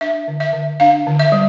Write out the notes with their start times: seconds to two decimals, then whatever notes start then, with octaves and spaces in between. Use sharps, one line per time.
0.01 D4 E5
0.28 D3
0.40 E5
0.53 D3
0.80 D4 F5
1.07 D3
1.19 E5
1.32 G3